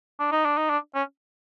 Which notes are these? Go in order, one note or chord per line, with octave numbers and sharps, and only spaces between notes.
D4
D#4
D4
D#4
D4
C#4